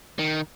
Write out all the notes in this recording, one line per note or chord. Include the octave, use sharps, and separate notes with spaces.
D#3